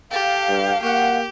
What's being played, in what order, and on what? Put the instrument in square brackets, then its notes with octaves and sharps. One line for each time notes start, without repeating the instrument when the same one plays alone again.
[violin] G4 [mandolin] A4 A5 [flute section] F5
[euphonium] G2
[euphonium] A#3 [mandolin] F#4 F#5 [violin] G4